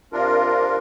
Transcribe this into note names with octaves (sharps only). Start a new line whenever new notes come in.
C3 D4 F4 A#4